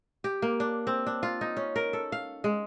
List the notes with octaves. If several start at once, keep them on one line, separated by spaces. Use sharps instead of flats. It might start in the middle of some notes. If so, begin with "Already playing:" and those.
G4
A#3
D4
C4
D4
F4
D#4
C#4
A#4
A4
F5
G#3